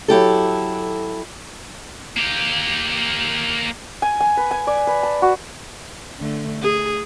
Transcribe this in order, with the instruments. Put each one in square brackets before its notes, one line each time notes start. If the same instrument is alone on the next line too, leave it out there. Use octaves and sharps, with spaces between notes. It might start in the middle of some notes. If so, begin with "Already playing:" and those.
[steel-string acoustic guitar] F#3 E4 G4 A4
[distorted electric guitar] A#3 G4
[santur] G#5
G#5
B4
G#5
D5
B4
A5
F#4
[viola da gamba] D3 A3
G#4